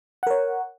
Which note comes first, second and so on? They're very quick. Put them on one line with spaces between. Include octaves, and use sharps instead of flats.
F#5 A#4 C#5